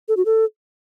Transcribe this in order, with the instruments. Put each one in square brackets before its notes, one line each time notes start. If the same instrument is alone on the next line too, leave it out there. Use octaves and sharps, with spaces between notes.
[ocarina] A4
F#4
A4